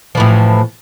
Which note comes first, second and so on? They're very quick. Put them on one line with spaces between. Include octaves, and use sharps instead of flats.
F3 E3 A2